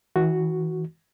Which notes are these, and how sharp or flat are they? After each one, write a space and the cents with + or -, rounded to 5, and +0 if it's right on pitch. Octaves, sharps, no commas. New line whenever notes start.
E3 -40 F#4 +0